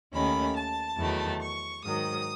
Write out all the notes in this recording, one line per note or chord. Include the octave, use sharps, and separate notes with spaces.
D#2 D#3 A3 C#4 B5
A5
E2 D#3 F#3 A3
C#6
G#2 D#3 F#3 D#6